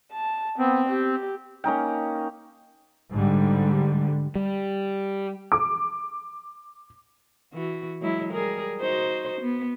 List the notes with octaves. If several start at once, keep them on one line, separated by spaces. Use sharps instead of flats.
A5
B3 C4
G4
A#3 C#4 D#4 G5
G#2 D3 G3
G3
D6
E3 F#4
F#3 G#3 E4
G3 G#4 A#4
D#4 F#4 C5
B3